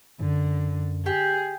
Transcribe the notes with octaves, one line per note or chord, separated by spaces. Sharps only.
F#2 D3
G4 G#4